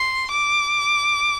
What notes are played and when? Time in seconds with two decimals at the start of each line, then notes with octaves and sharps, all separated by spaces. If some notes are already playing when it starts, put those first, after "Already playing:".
Already playing: C6
0.31 D6